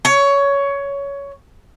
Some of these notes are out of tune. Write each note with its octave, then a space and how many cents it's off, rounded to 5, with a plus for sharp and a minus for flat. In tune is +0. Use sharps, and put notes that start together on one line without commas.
C#5 +15